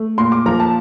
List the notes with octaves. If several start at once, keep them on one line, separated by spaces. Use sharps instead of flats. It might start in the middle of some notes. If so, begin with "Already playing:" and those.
Already playing: A3
A#2 C6
D6
F3 A#5
A5